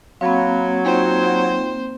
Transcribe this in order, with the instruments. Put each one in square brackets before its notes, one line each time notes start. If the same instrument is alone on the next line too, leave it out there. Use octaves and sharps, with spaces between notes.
[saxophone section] F#3 [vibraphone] A#3 C4 [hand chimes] F5 B5
[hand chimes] D#4 F4 G5 [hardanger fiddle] C5